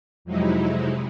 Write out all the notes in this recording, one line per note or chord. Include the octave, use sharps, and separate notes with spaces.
F2 C3 F#3 G#3 D#4 E4